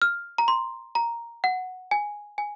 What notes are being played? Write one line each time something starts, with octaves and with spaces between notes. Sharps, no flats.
F6
A#5
C6
A#5
F#5
G#5
G#5